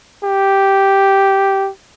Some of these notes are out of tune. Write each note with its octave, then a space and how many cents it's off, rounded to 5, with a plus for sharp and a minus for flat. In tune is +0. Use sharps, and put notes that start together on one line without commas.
G4 -5